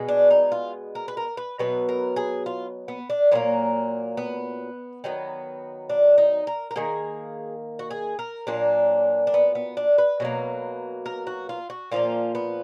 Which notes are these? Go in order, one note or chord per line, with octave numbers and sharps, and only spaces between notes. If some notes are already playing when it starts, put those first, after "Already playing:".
Already playing: B2 G#3 B3
D4
D#4
F4
A#4
B4
A#4
B4
B2 F#3 B3 B4
A#4
G#4
F4
B3
D4
A#2 F#3 A#3 B3
B3
D#3 F#3 B3
D4
D#4
A#4
A#4
D#3 A#3 G#4
F#4
G#4
A#4
A#2 F#3 A#3 D4
D4
B3
B3
D4
B4
B2 F#3 A#3
A#4
F#4
F4
F#4
A#2 F3 A#3 F4
B3